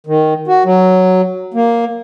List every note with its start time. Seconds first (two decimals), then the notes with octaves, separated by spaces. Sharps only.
0.07 D#3
0.48 F#4
0.64 F#3
1.54 A#3